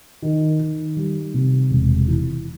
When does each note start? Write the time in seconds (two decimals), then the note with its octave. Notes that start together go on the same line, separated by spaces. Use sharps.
0.22 D#3
0.60 D#3
0.97 G3
1.34 C3
1.70 E1
2.08 E3